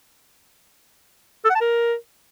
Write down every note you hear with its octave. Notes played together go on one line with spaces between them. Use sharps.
A4
F#5
A5
A#4